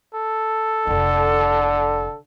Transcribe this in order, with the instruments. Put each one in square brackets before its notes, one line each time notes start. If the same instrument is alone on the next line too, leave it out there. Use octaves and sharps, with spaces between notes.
[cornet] A4
[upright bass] F1 E4 [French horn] D3